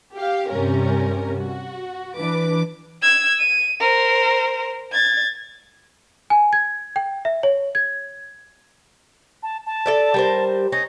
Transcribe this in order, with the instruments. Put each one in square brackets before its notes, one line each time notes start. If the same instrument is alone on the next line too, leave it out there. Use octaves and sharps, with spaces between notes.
[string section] G4 F5
G2 C3 G3 C#4 A#4
F#4
E3 D4 B4 D6
[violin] E6 G#6
D#7
A#4 C5
G#6 A6
[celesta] G#5
G#6
G5
E5
C#5
G#6
[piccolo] A5
A5
[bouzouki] A4 D5 E5
G3 A#4 C5
[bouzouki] C#4 D#4 [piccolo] A#6